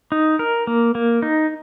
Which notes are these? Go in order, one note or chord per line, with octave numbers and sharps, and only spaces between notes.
D#4
A#4
A#3
A#3
D#4